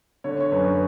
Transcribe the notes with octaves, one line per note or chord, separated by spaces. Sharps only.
D3 C#5
C#5
F#2 B4